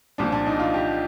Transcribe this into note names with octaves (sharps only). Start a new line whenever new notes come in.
C2 A#2 F3 D4
D4
D#4
F4
G4